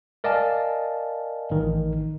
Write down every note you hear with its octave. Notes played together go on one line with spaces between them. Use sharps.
A#4 D5 D#5 F5 G#5 A5
A1 D#3